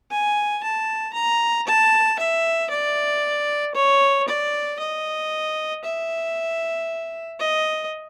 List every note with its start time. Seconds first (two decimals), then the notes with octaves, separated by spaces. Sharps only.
0.11 G#5
0.63 A5
1.14 A#5
1.67 A5
2.20 E5
2.70 D5
3.75 C#5
4.28 D5
4.80 D#5
5.85 E5
7.40 D#5